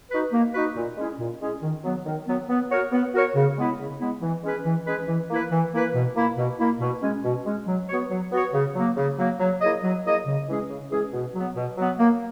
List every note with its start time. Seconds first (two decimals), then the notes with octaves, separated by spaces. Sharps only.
0.11 D#4 F#4 B4
0.33 A#3
0.54 D#4 F#4 B4
0.76 A#2
0.98 G#3 C#4 E4 G#4
1.19 A#2
1.41 G#3 C#4 E4 G#4
1.62 D#3
1.84 F#3 B3
2.06 D#3
2.27 F#3 B3
2.49 B3
2.71 F#4 A#4 C#5
2.92 B3
3.14 F#4 A#4 C#5
3.35 C#3
3.57 G#3 B3 E4
3.79 C#3
4.00 G#3 B3 E4
4.22 E3
4.43 G#3 C#4 G#4 B4
4.65 E3
4.87 G#3 C#4 G#4 B4
5.08 E3
5.30 A#3 E4 B4
5.51 E3
5.73 A#3 E4 B4
5.94 B2
6.16 A#3 E4
6.38 B2
6.59 A#3 E4
6.81 B2
7.02 G#3 C#4
7.24 B2
7.46 G#3 C#4
7.67 F#3
7.89 B3 F#4 C#5
8.10 F#3
8.32 B3 F#4 C#5
8.54 C#3
8.75 F#3 A#3
8.97 C#3
9.19 F#3 A#3
9.40 F#3
9.62 A#3 E4 G#4 D#5
9.83 F#3
10.05 A#3 E4 G#4 D#5
10.26 C#3
10.48 E3 G#3 C#4 G#4
10.70 C#3
10.91 E3 G#3 C#4 G#4
11.13 B2
11.35 F#3 B3
11.56 B2
11.78 F#3 B3
11.99 A#3